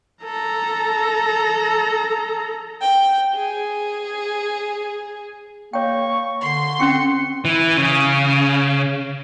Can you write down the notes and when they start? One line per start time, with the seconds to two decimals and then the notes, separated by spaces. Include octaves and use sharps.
0.23 A4 A#5
2.81 G5
3.35 G#4
5.73 A#3 C#5 G5 C#6
6.43 D3 C6
6.80 C4 C#4 C#6 C#7
7.45 E3
7.77 C#3